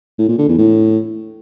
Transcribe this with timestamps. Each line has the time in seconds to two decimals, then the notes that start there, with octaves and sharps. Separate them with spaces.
0.18 A2
0.28 A#2
0.38 D3
0.48 E2
0.58 A2